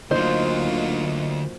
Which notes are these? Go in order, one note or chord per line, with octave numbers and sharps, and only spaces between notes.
D2 D3 F#3 A#3 D#4 F4 C5